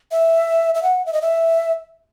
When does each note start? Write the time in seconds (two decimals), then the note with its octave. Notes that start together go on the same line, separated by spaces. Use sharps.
0.12 E5
0.75 E5
0.83 F#5
1.06 E5
1.13 D#5
1.22 E5